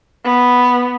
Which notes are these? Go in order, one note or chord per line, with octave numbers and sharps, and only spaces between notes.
B3